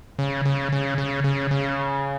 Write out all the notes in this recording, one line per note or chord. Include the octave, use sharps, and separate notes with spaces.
C#3
C#3
C#3
C#3
C#3
C#3